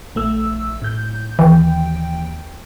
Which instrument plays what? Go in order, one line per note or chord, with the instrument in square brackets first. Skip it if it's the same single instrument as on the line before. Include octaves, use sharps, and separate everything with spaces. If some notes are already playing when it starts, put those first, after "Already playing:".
[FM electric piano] A#1 A3 E6
A2 G6
[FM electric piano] D#2 G5 [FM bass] E3